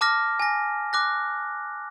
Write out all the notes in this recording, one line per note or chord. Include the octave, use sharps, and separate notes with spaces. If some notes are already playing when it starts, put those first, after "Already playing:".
A5 D6 F6 A#6
G#5 A#6
D6 F#6 A#6